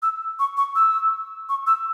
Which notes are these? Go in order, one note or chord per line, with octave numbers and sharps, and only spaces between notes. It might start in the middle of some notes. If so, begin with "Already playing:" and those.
E6
C#6
C#6
E6
C#6
E6